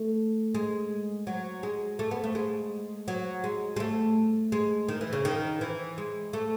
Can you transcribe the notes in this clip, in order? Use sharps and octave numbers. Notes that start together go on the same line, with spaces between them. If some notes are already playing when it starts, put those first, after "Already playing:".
Already playing: A3
G#3
F#3
G#3
A3
B3
A3
G#3
F#3
G#3
G#3
A3
G#3
D#3
E3
C#3
D#3
E3
G#3
A3